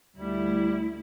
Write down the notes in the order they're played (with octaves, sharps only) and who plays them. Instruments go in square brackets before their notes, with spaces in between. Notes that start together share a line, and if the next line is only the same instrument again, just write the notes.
[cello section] D2 E4 [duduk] G3